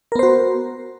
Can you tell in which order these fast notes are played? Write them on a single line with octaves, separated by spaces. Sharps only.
A#4 B3 C5 F#4